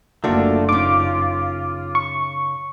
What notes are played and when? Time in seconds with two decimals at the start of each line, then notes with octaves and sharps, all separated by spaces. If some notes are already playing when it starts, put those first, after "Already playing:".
0.24 F#1 D2 A3 A#3 D4 F4 F#4
0.69 C#3 D#4 F4 D6
1.95 C#6